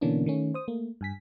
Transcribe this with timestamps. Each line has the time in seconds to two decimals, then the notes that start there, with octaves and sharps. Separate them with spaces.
0.01 B2 D3 E3 A#3 C#4 D4
0.26 D#3 A3 C#4
0.54 C5 D#6
0.68 A3 A#3
1.01 G2 G#5 B6